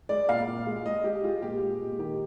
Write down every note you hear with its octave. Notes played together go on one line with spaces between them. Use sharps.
G#3 D5
A#2 F5
A#2
G#3
G#3 D#5
G#3 G4
G#3 F4
A#2 G4
G#3
A#2
D#3 G4